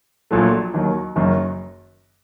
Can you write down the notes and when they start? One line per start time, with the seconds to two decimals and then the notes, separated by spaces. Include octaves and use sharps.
0.31 A#1 A#2 F#3 A3
0.73 D#2 D#3 F#3
1.16 F#1 F#2 D#3